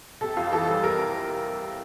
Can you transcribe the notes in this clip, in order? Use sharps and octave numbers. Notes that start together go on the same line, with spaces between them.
C3 A4
F2 F4
E3 A4
G3 A4
C3 A#4